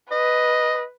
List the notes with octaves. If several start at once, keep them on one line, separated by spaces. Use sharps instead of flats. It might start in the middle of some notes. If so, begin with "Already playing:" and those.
B4 D#5